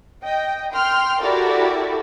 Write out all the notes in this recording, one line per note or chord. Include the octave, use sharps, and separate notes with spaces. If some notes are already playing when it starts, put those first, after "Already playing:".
D#5 G5
G5 C6 F6
E4 F#4 G4 A4 A#4 D5